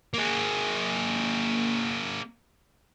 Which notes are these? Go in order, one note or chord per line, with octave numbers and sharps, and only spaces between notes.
A#3 G#4